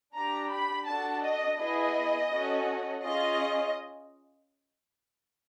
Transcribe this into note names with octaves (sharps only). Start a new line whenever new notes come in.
D4 G4 A#5
B5
D4 F#4 A4 A5
D#5
B3 E4 G#4 D#5
C#4 F#4 A4
C#4 F4 G#4 D#5